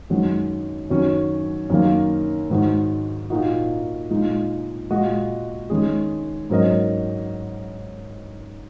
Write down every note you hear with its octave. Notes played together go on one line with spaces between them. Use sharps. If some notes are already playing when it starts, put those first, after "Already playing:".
F#2 D#3 G#3 F#4
F#2 D#3 F#3 C#4
F#2 D#3 A#3
G#2 D#3 G#3 F#4
A#2 A#3 D#4 F#4 D#5
A#2 G#3 D#4
A#2 G#3 F#4 D#5
D#3 G#3 C#4 G#4
G#2 F#3 C#4 A#4 D#5